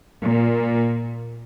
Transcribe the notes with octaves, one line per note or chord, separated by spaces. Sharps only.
A#2